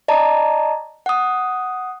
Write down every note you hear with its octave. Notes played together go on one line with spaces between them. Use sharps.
D5 D#5 A5 A#5
F#5 D#6